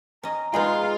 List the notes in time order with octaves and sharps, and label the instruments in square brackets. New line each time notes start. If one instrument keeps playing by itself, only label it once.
[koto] C#4 D#5 [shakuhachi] A#5
[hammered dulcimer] G#3 [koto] B3 D#4 G#4 [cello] F4